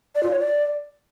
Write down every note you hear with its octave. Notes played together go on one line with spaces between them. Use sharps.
D5
F4
C#5
D5